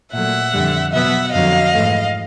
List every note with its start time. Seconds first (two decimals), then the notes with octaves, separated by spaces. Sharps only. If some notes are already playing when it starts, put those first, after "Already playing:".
0.13 A#2 F#3 A3 E5 F#5
0.52 F2 D3 G3
0.92 B2 F#3 B3 E5 F#5
1.32 F2 D3 F#3 D#5 F5
1.72 G#2 E3 A3